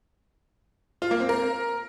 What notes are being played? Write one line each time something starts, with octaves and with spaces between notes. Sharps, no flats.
F4
A#3
C4
A#4